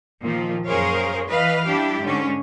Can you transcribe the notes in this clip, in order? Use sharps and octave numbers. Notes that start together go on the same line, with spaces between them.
A#2 D#3 F3
F#2 G#4 A#4 C5 C#5 F5
E3 B4 D#5 F5
G3 D4 E4 G4
G#2 D3 C#4